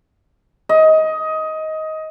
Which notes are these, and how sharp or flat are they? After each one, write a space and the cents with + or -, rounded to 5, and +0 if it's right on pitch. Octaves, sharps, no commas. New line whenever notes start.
D#5 +15